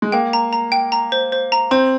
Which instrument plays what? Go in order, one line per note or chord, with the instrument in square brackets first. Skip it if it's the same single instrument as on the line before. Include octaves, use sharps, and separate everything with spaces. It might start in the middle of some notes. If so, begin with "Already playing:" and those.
[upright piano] G#3
[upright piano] A#3 [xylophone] G5
[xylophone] A#5
A#5
G5
A#5
C5
C5
A#5
[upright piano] C4 [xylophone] C5